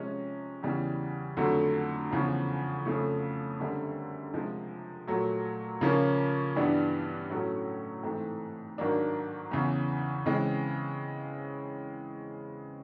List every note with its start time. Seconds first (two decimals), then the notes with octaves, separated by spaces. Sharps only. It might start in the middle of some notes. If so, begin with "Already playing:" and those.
Already playing: C3 F3 G#3 C#4
0.63 E2 C#3 E3 G3
1.37 F2 D3 F#3 A3
2.11 E2 C#3 F3
2.85 F2 C#3 F3 A3
3.60 F#2 D3 G3 C4
4.34 C3 F3 G#3
5.07 A#2 F#3 A3
5.81 C#3 F3 A#3 C#4
6.56 G2 E3 G3 B3 D4
7.30 A2 F#3 A3 C#4
8.03 G#2 E3 A3 C4
8.78 G#2 D#3 F#3 A#3 D4
9.51 E2 C#3 E3
10.26 C#3 E3 G#3 C4